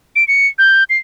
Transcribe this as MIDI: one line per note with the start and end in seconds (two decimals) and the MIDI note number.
0.16 0.26 98
0.28 0.47 97
0.59 0.84 91
0.90 0.98 96